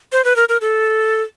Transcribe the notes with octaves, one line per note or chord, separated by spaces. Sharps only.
C5
B4
A#4
A#4
A4